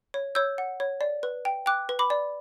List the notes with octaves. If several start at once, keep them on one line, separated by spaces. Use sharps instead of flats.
C#5
C#5 E6 G6
F#5
C#5
D5
B4
G5
G5 D6 F#6
B4
B5 D6
D5